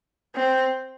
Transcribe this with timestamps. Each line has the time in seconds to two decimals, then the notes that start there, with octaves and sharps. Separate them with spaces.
0.36 C4